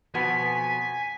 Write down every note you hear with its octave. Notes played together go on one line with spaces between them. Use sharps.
F2 B2 B3 G#5 B6